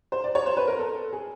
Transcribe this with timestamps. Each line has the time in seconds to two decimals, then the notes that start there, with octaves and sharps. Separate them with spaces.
0.12 C5
0.24 D5
0.35 C#5
0.46 C5
0.57 B4
0.68 A#4
0.79 A4
1.13 G#4